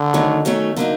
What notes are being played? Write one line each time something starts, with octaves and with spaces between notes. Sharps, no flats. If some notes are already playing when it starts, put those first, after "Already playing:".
Already playing: D3
D#3 F#3 A3
D#3 F#3 A3 C#4
D3 F#3 A#3 D#4